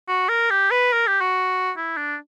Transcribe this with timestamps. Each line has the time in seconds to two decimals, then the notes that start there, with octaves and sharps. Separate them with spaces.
0.08 F#4
0.29 A#4
0.50 G4
0.71 B4
0.93 A#4
1.07 G4
1.21 F#4
1.77 E4
1.97 D4